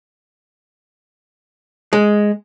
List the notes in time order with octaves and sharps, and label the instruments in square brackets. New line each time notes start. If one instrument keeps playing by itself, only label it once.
[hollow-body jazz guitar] G#3